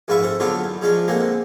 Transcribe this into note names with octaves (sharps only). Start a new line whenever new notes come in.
A#1 G#2 F4 B4 E5 C#6
C4 A4
D3 F#3 B3 D4 F4 A4
E2
C#3 F3 G#3 C#4 D4
D3 G#3 A#3 C4